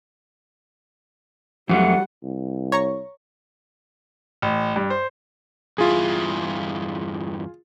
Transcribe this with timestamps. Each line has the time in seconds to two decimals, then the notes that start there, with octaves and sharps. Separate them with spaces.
1.69 F2 F#3 G3 A3 F#5
2.23 C2
2.72 C#5 A#5 C#6
4.42 A1
4.76 G2
4.90 C5
5.78 E2 G2 E4 F4 G#4